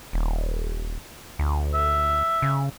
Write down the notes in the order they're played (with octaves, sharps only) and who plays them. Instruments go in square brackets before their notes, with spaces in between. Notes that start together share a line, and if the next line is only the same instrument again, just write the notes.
[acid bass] D#1
D2
[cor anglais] E5
[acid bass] C#3